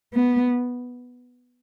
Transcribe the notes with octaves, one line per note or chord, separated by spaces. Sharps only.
B3